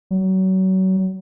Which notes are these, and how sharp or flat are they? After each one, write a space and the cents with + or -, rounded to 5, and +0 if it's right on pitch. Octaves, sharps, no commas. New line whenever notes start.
F#3 +30